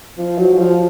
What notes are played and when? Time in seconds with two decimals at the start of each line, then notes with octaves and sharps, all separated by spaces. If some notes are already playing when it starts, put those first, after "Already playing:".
0.18 F3
0.38 F#3
0.53 F#3
0.58 F3